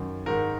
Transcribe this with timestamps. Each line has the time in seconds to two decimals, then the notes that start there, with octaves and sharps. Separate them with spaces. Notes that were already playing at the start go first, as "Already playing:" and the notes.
Already playing: F#2 D#3
0.26 G#2 D#3 A#4